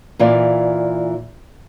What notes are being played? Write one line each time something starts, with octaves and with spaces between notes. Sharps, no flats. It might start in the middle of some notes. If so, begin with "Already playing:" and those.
A#2 E3 F4 D5